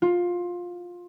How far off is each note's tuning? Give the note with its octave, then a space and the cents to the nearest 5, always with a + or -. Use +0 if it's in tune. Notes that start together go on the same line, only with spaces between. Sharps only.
F4 +15